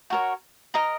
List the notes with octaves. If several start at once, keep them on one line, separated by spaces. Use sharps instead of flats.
F#4 A#4 C#5
A#4 D#5 A#5